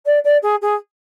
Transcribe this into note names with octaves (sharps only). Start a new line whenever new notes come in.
D5
D5
G#4
G#4